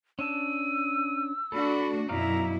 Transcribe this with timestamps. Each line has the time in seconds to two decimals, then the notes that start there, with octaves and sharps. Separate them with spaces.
0.19 C#4 D4 A5 E6 D#7
1.52 A3 D4 F#4 A4 B5
2.09 F#2 B2 D#4 E4 D5 F5 A#5